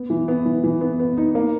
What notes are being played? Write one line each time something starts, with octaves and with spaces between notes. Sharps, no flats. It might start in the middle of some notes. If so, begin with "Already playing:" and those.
Already playing: B3
E3
B3
E3
E3
B3
B3
D#4
A#3